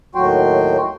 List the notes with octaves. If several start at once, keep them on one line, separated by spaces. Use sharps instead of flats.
D#2 A2 F#3 F#4 G5 C6